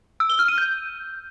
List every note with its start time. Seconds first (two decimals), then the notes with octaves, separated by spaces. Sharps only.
0.20 E6
0.30 G7
0.39 F6
0.48 D#7
0.58 G6